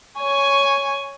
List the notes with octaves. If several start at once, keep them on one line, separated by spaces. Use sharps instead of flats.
C#5 G#5